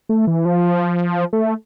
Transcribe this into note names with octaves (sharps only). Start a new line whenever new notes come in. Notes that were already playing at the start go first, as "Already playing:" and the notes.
A3
E3
F3
A3